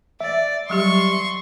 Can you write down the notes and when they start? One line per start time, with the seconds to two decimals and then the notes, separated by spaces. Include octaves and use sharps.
0.20 D5 E5
0.70 F#3 G3 G4 C6 C#6